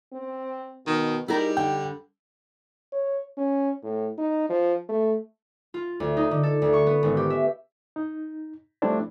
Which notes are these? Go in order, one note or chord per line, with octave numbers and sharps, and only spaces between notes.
C4
B2 D#3
G3 D#4 E4 G#4 A#4
D3 G5
C#5
C#4
A2
D#4
F3
A3
F4
D2
D#4
D3
A4
D2
C#6
B3
G#1
G4
E5
D#4
F3 G3 A3 C4 D4 E4